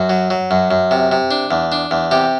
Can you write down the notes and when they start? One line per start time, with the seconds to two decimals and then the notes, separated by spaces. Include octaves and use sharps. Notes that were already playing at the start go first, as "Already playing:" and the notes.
Already playing: F#2 F#4
0.10 F#3
0.30 F#3
0.51 F#2
0.71 F#2
0.91 C3
1.12 C3
1.31 D4
1.51 E2
1.72 D4
1.91 E2
2.11 C3 G4